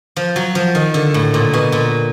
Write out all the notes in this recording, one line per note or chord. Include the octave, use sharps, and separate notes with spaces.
F3
F#3
F3
D#3
D3
A2
A#2
B2
A#2